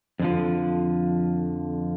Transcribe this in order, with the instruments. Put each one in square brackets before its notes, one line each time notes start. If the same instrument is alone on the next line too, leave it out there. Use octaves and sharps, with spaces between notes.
[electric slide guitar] F2 D3 F3